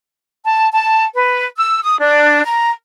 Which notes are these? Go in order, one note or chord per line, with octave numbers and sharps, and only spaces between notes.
A5
A5
B4
E6
D#6
D4
A#5